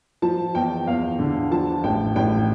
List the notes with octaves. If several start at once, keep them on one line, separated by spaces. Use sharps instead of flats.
F3 A5
E2 G5
E2 F5
D3
F3 A5
A1 G5
A1 G5